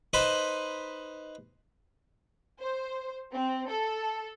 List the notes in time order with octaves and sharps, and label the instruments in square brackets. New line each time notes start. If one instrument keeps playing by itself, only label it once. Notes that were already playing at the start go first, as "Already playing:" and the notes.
[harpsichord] D#4 B4 C5 B5 C6 D#6
[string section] C5
C4
A4